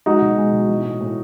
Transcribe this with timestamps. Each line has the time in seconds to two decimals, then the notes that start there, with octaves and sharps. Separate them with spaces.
0.06 G#3 D#4 F#4
0.22 B2
0.38 G#3
0.53 B2
0.68 E3
0.84 A2
1.01 A2